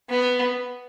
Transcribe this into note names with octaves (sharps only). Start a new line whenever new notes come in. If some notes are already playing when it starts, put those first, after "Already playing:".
B3